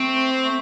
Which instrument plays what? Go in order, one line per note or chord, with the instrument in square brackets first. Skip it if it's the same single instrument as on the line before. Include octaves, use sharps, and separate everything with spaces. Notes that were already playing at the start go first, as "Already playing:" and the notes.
Already playing: [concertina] A3 [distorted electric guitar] C4
[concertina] C5
A3